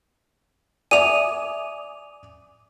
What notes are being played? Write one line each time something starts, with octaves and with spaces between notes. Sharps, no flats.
D5 E5 G#5 D6 D#6 D#7 F7